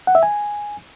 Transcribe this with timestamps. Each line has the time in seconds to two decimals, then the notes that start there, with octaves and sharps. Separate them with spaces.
0.07 F#5
0.15 E5
0.23 G#5